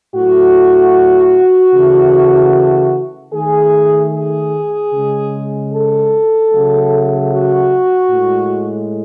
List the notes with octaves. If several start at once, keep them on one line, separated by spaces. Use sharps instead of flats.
A2 F#3 A3 F#4
C#3 E3 A3
D#3 A3 G#4
G#4
C#3 G#3
A4
C#3 F#3 A3
F#4
A2 G#3